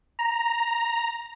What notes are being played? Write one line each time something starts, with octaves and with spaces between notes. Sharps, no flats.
A#5